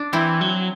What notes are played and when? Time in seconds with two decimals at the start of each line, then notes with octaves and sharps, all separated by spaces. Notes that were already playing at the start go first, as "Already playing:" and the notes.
Already playing: D4
0.13 E3 C4 E4
0.41 F#3